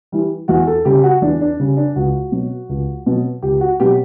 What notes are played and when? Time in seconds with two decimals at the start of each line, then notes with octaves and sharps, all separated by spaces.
0.12 E3 G3
0.48 E2 F#4
0.67 A4
0.85 C#3 G3 G4
1.03 F#4
1.22 E2 D4
1.41 D4
1.60 C#3 G3
1.77 D4
1.96 C#2 F#4
2.32 B2 F#3
2.69 C#2
3.06 B2 F#3
3.42 C#2 G4
3.61 F#4
3.80 B2 F#3 G4